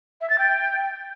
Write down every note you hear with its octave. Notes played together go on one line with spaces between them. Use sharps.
E5
A6
G5